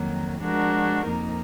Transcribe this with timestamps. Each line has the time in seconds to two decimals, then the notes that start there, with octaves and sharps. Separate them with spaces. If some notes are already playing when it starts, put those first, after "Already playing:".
Already playing: F2 D#3 F#3 A#3
0.41 F3 G#3 D4 F#4 A#4
1.06 F2 F3 A#3 D#4